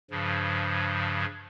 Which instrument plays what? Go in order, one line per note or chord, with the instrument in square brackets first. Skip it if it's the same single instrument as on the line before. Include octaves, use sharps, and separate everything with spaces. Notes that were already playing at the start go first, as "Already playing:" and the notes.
[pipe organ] G2 C#3 F3